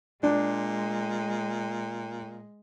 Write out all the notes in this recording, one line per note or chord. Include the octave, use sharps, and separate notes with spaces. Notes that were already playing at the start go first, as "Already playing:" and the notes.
A#2 G#3 D4